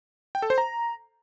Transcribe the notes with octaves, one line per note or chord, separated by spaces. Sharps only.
G5
A4
C5
A#5